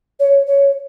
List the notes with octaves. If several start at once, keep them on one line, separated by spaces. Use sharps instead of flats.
C#5
C#5